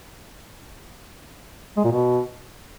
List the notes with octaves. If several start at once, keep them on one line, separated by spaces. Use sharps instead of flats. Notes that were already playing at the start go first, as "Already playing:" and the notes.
G#3
A#2
B2